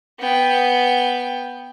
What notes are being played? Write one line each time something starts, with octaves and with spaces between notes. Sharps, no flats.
B3 G5